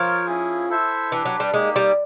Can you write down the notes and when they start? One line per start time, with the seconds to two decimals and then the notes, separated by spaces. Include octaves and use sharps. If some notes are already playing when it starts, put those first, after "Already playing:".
Already playing: F3 F4 A#4 C#5
0.26 C#4 E4 G#4
0.70 E4 A4 C5 E5
1.11 E3 D4 G4 B4
1.25 F#3
1.40 G3
1.54 G#3 A#3 D#4 G4
1.76 G3